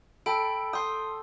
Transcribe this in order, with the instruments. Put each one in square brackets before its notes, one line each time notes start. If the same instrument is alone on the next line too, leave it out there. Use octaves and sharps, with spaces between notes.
[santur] A4 [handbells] G5 B5 D7
[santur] G5 [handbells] C6 D#6